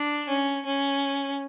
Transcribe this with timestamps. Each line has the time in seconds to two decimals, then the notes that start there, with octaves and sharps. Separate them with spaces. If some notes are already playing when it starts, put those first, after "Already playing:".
Already playing: D4
0.28 C#4
0.65 C#4